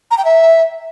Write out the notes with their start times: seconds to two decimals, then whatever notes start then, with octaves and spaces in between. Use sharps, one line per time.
0.11 A#5
0.18 G5
0.25 E5